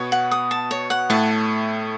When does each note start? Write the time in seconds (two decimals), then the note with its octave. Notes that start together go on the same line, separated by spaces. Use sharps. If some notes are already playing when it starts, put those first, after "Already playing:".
Already playing: B2 B3 C#5
0.12 F#5
0.31 D#6
0.51 A5
0.71 C#5
0.90 F#5
1.10 A2 A3 A5